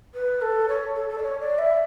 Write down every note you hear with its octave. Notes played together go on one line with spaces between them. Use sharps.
B4
A4
C#5
A4
A4
D5
C#5
D5
E5